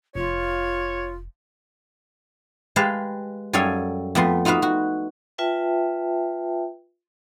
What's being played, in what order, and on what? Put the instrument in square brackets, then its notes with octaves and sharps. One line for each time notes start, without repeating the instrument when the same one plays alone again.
[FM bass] F1 [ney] F4 [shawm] C#5
[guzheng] G#3 G4 B4 F5 A5
F#2 G3 A4 C#5 F5 G#5
F2 A3 B3 C6
D#4 F4 F#4 B4 F5
F#4
[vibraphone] F4 B4 E5 G5 A5